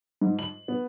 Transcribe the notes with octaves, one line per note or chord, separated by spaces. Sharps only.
G#2
F#7
B3